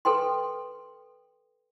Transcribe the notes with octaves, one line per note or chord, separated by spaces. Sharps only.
A4 B4 G5 C6